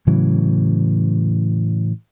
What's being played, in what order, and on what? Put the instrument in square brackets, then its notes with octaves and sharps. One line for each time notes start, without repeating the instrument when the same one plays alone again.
[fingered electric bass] A2 C#3 E3 F#3